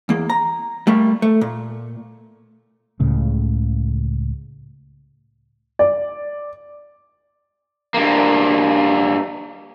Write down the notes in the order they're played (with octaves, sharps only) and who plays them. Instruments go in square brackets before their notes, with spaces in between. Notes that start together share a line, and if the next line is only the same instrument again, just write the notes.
[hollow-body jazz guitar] E2 A#3
A#5
G3 A3 A#3
A3
A#2
[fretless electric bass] C#2 A2 C#3
[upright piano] D5
[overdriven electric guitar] G2 A#3